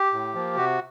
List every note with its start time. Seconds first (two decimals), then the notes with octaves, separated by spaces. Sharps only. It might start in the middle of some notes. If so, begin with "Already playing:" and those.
Already playing: G4
0.13 A2
0.35 F3 A#3
0.56 C3 F#4